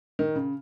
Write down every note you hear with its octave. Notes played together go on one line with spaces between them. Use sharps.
D#3
C#3